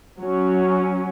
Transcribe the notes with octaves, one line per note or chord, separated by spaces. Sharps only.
F#3 C#4